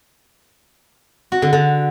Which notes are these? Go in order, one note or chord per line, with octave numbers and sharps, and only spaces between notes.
F#4
D3
D3